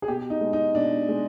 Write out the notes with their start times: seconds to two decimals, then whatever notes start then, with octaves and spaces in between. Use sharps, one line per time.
0.02 G#4
0.08 B2 G4
0.30 D#4
0.41 G#3
0.53 D#4
0.75 B2 D4
1.09 G#3